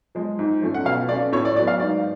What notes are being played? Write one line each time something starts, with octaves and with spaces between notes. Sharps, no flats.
F3 G#3
G#2
F3 A3 C#4
F#5
B2 F5
A3 C#4 D5
A2 C#5
D5
F#3 B3 D5
F5
G#2 D5